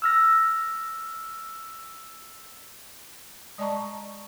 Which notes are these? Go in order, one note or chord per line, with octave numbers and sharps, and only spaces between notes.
E6 F6 A#6
G#3 D5 D#5 A5 A#5 C#6